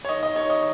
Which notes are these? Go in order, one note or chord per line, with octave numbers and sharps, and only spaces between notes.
C#5
D#3 D#5
D#5
D#3 C#5
D#5